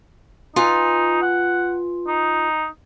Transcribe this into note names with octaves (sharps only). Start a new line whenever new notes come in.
D#4 F4 B4 G#5
F#5
D#4